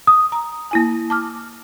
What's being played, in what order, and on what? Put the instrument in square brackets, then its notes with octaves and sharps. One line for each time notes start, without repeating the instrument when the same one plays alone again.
[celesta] D#6
[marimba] A#5
A#3 E4 G#5
A5 D6 F6